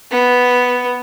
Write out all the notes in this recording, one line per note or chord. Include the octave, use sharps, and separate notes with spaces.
B3